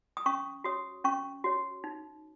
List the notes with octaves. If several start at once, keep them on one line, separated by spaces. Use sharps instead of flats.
D#6
C#4 C#6
F#4 C#5 D#6
C#4 C#6
F#4 C#5
D#4